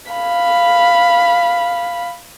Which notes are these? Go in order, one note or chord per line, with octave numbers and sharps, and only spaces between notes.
F5 B5